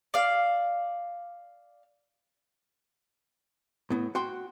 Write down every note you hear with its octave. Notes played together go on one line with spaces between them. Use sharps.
D5 F5
A2 B3
F#4 G5 C6